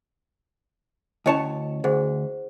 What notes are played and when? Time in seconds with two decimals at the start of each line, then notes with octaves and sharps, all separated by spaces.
1.26 D2 C#4 E4 C#5 D#5 A5
1.84 D2 G#4 C5 F#5